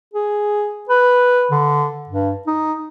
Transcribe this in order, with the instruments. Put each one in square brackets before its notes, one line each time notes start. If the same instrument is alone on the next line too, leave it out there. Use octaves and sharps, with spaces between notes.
[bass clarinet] G#4
B4
D3
G2
D#4